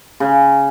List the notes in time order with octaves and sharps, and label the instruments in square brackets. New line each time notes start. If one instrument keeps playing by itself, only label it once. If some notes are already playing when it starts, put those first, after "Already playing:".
[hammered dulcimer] C#3